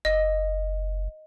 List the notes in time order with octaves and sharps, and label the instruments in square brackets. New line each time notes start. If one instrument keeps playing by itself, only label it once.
[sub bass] F#1 [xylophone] D#5